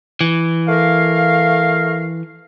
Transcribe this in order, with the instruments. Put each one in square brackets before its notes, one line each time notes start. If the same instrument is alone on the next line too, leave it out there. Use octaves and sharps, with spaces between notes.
[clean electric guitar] E3
[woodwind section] A3 A#4 F5